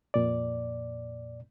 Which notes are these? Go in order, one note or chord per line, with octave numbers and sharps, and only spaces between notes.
F2 A#2 D5